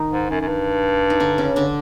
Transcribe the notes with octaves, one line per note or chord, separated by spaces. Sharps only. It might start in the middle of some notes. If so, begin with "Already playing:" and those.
Already playing: D#3 D#4
G#2
F#2
F#2
G2
D#4
D3 D4
C#3 C#4
D3 D4